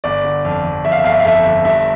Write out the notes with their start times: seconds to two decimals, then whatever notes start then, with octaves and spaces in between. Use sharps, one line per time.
0.04 G1 D5
0.24 D3
0.45 F2
0.64 F2
0.84 F2 E5
0.92 F5
0.98 E5
1.04 G1 F5
1.13 E5
1.20 F5
1.24 F2 E5
1.44 G1
1.65 G2 E5